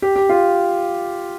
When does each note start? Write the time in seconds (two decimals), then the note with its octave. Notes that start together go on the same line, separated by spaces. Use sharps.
0.02 G4
0.16 G4
0.29 F4